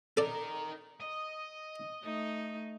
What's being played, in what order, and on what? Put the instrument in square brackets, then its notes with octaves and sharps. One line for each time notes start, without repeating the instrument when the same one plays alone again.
[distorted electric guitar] D#4 A#4 [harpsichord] A4 D5
[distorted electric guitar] D#5
[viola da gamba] A3 D#4